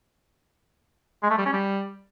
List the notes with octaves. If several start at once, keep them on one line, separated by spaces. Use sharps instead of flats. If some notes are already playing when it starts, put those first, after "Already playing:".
G#3
A3
G3
C#4
G3